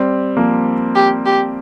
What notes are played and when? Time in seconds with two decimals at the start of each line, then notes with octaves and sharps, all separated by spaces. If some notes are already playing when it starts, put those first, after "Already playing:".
Already playing: G3 C4
0.37 F3 A#3
0.95 G4
1.26 G4